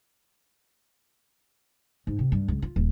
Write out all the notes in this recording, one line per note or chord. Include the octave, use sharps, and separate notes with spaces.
G#2
C3
G2
C#2
F4
D#1